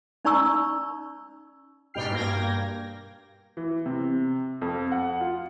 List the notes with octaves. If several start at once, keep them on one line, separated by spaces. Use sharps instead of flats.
C#4 D#4 D5 A#5 C#6 E6
G#2 B2 G3 G5 F6 C7
G2 A#3 G5 G#6 A#6
E3
C3
F2
F#5
F4